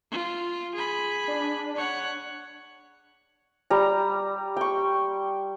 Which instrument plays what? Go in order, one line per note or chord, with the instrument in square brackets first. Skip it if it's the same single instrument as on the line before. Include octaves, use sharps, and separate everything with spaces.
[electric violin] F4
G#4 B5
[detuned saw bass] D4
[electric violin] C#5 F#5
[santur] G3 A#5
G5 C#6